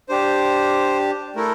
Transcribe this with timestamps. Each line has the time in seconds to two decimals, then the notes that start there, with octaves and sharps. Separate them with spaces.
0.09 D4 G4 C5
1.36 A3 E4 A4 A#4